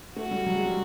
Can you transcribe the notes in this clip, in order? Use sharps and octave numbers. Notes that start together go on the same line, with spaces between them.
A3 F#4
G3
F#3
G#3
G3